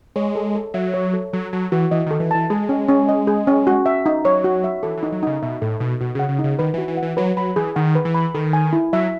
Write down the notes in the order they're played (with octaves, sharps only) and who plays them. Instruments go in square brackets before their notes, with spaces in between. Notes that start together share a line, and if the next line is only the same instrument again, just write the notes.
[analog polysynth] G#3 [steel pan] C#5
[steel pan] A4
A4
[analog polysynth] F#3 [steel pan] E5
[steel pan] C#5
A4
[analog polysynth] F#3 [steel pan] A4
[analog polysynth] F#3 [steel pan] A5
[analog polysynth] E3 [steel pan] F#4
[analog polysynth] E3 [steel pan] D#5
[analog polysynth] D#3 [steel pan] A4
[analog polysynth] E3
[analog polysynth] E3 [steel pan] A5
[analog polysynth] G#3 [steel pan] G#4
[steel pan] C#4
C#4
D#5
G#4
C#4
F#4
E5
D#4
[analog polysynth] F#3 [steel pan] C#5
[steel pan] F#4
E5
[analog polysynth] E3 [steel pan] A4
[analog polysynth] E3
[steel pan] D#4
[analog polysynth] F#3
[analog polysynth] C#3 [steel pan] D#4
[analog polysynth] B2 [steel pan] E5
[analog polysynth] A2 [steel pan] A4
[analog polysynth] B2 [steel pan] D#4
[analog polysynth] B2 [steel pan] F#4
[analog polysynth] C#3 [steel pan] F#5
[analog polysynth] C#3
[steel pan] D#4
[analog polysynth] C#3
[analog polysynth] D#3 [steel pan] B4
[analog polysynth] E3 [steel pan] F#4
[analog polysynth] E3
[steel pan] F#5
[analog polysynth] E3
[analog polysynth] F#3 [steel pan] B4
[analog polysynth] F#3 [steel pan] B5
[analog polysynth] E3 [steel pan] G#4
[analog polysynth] D#3 [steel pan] F#5
[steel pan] B4
[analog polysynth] E3
[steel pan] B5
[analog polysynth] D#3 [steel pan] A4
[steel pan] G#5
E4
[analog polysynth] F#3 [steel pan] E5